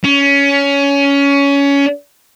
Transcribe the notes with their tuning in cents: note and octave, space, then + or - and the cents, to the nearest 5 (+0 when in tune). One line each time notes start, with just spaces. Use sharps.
C#4 +20